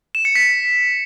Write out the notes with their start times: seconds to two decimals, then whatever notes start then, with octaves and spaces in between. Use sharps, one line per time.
0.15 E7
0.25 C#7
0.35 B6